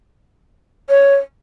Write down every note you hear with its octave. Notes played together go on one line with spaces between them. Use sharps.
C#5